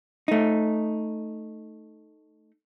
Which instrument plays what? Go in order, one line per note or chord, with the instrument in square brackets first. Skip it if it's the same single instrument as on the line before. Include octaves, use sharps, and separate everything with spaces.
[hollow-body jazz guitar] A3 D#4